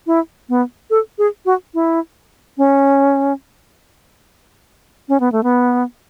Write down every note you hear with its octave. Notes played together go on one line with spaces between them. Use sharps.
E4
B3
A4
G#4
F#4
E4
C#4
C#4
B3
A3
B3